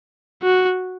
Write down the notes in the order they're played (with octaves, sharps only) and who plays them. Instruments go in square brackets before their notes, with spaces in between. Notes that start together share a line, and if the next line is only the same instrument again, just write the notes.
[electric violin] F#4